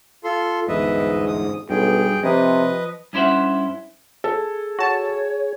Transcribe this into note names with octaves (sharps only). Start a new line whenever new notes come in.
F4 A4 C6
G1 E2 G#2 B4 D#5 E5
D#6
B1 G2 G#4 G5
C3 F3 B4 D#5
G2 C#4 E4 C5 E5 F#5
G#4 A4
F#4 C#5 A5